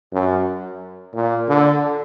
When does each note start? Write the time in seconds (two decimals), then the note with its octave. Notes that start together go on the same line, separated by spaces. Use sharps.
0.13 F#2
1.14 A#2
1.48 D3